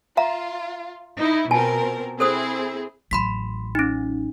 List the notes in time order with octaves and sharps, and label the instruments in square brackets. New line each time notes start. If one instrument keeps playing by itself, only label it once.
[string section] F4 [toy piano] E5 F5 A#5
[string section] D#4 E4
[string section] B2 C4 A#4 [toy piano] F4 G#5 A5
[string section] C4 E4 G#4 [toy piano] A4 C5 D#6
[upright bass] A1 F#3 [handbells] B5 C6 B6
[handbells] C#4 D#4